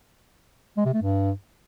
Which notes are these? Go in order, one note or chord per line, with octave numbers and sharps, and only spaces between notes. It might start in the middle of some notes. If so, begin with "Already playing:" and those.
G#3
C3
A3
G2